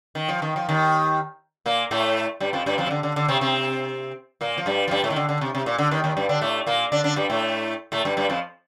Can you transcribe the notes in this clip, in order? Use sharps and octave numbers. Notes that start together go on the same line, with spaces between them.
D#3
F3
D#3
F3
D#2 D#3
A#2 A#3
A2 A3
G2 G3
F2 F3
G2 G3
F2 F3
C3
D3
D3
D3
C3 C4
C3 C4
A#2 A#3
F3
G2 G3
F3
G2 G3
A2 A3
D#3
D3
D3
C3
C3
A#2
D3
D#2 D#3
D#2 D#3
G2 G3
D3 D4
A2 A3
A#2 A#3
D3 D4
D3 D4
G2 G3
A2 A3
A2 A3
G2 G3
G2 G3
F2 F3